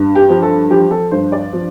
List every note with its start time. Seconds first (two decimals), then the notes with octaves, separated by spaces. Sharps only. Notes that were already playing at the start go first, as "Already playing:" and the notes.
Already playing: G2
0.15 G4
0.29 F3
0.42 A4
0.70 F3 G4
0.91 A4
1.11 G2 C5
1.32 D5
1.53 F3